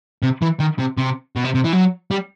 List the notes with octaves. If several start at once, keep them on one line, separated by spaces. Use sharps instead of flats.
C3
E3
D#3
C3
C3
B2
C3
C3
E3
F#3
G3